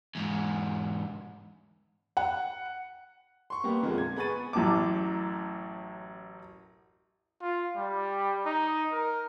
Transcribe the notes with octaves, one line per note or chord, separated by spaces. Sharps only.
E2 G#2
F#5
C6 C#6
G3 A#3 B3 G4
F2 A#2 D3 F3 G#3 A#3
G#6
B3 G#4 B5 C#6 A6 D#7
A1 F#2 A2 A5 D6
F4
G3
D#4
A#4